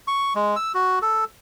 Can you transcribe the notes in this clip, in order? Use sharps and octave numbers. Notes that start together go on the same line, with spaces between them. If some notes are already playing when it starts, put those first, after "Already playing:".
C#6
G#3
E6
F#4
A4